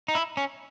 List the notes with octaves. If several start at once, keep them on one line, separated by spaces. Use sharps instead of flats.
D#4
E4
C#4